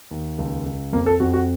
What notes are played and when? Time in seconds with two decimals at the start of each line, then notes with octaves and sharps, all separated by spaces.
0.11 D#2
0.38 C#2
0.66 C#2
0.93 F2 A#3
1.06 A4
1.20 F2 F#4
1.33 F#4